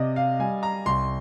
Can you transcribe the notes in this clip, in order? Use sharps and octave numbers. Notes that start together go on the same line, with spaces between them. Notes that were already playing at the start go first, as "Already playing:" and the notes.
Already playing: C3 D5 D#5
F5
G3 G#5
A#5
C2 C6